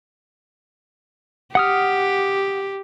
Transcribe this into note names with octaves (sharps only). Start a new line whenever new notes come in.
G4 F#5 D#6 F6